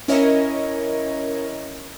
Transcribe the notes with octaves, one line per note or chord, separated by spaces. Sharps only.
C#4 E4 A#4 C#5 D#5